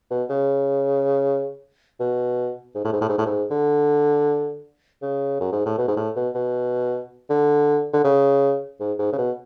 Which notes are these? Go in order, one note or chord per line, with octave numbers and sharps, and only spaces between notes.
B2
C#3
B2
G#2
A2
G#2
A2
G#2
A2
G#2
D3
C#3
F#2
G#2
A2
B2
G#2
A2
B2
B2
D3
D3
C#3
G#2
G#2
C#3
B2